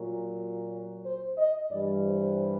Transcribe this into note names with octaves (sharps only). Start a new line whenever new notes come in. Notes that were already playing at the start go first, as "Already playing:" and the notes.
Already playing: A#2 F#3
C5
D#5
G2 E3 G3 D5
C5